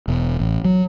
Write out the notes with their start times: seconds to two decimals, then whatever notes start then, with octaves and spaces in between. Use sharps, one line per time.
0.08 E1
0.40 A1
0.65 F#3